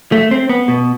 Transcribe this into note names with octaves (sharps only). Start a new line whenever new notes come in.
A3
C4
B3
B2